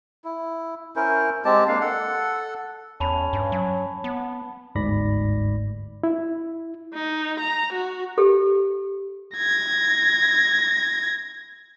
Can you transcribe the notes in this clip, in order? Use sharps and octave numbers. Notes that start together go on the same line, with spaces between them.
E4
C#4 E4 A#4 C5
G#3 C4 G4 A5
G#3 A#3 D4 F5
A4 F#5
E2 C#4 A5 B5
G2
F#3
B3
G1 D2 G#2 D5 B5 A#6
E4
D#4
A#5
F#4
G4 A4
G#6 A#6